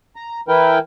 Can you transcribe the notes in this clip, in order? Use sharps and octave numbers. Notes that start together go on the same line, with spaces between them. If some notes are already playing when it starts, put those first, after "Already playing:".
A#5
E3 E4 A#4 B4 G5